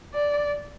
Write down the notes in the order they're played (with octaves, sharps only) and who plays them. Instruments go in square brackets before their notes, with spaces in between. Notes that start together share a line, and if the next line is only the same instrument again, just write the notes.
[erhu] D5